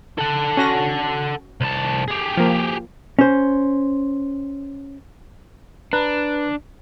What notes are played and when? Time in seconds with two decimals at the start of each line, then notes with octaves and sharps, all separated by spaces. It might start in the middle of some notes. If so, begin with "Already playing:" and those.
0.19 A4 F#5
0.57 C#4 F#4 A#6
1.61 C2 A5
2.08 G4 G#4
2.37 F3 A#3
3.19 C#4 C5
5.93 D4 B4 A#5 F#6